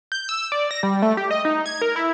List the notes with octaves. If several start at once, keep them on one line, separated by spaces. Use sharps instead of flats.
G6
E6
D5
A#6
G3
A3
G4
D#5
D#4
G#6
A#4
E4